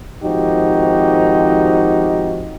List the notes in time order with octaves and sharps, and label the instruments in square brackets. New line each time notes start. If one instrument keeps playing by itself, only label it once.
[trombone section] G#1 F3 D#4 F#4 G4